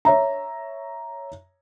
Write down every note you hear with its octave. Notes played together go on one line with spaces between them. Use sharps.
C#5 E5 A#5